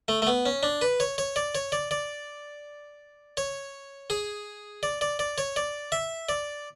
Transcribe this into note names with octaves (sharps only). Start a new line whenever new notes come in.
A3
A3
B3
C#4
D4
B4
C#5
C#5
D5
C#5
D5
D5
C#5
G#4
D5
D5
D5
C#5
D5
E5
D5